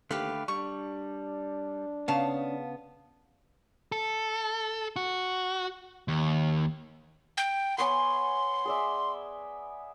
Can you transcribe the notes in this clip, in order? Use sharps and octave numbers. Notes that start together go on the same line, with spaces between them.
D#2 D3 A3 G4 B4 F5
G3 D4 C#6
C#3 B3 F5 A5
A4
F#4
D#2
G5
B3 C#5 G#5 C6
G#4 D5 E5